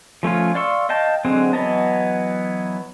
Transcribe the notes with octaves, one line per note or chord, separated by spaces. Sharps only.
F3 A3 C#4 F4
D5 F5 C6 C#6 E6
D#5 F5 G5 A5
D3 F#3 G#3 C4
E3 F#3 B3 D#5 A5